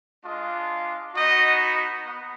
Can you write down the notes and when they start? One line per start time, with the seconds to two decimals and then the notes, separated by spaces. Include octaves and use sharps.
0.22 G#3 D4 F4 D#5
1.15 B3 D#4 F#4 D#5
2.06 B3